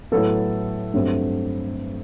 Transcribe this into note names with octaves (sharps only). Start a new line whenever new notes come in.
A2 F#3 B3 A4
G2 F#3 A3 C4